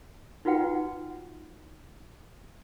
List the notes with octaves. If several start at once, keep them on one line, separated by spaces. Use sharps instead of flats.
D#4 F4 F#4 B4 F#5 G5